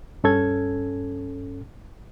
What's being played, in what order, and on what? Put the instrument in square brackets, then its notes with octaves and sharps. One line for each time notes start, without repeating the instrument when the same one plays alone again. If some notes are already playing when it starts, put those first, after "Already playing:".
[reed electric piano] G2 C#4 A4 G#6